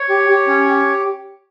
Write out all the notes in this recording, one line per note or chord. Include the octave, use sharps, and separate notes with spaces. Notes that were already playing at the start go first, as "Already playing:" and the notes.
Already playing: C#5
G4
G4
C#4
G4